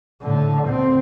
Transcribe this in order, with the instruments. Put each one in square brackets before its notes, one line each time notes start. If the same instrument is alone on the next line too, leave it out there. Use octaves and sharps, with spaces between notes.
[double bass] A2 D3
D2 C4